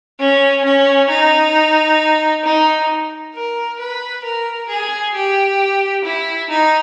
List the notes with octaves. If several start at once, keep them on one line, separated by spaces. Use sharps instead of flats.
C#4
C#4
D#4
D#4
A#4
B4
A#4
G#4
G4
E4
D#4